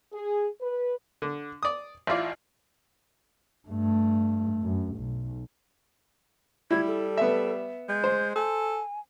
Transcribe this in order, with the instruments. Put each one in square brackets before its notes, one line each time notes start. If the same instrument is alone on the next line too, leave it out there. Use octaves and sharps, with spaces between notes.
[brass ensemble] G#4
B4
[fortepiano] D3
D5 D#6
A1 E4 F4 D5
[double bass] G2 A3
F#2
B1
[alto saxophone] G3 [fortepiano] E4 [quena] G#6
[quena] A4
[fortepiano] B3 E5
[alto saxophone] G#3 [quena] G6
[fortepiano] C5
[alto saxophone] A4 [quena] G#5